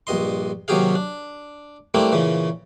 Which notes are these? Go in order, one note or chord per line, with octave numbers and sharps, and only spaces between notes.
A#1 G2 D#5 C6
D#2 C3 F#3 G4 G#4 F5
D4
G3 A3 A#3 C4 D4 E4
A#2 C#3 E3